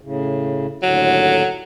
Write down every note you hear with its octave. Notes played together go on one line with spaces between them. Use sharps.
A2 C#3
D#2 A2 D3 F#3